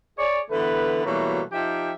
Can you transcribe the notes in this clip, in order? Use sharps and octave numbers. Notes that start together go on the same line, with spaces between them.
G#4 C#5 D5
D3 E3 A3 B3 B4
B2 E3 F#3 G3 A3 A#3
F3 D#4 G4 E5 G5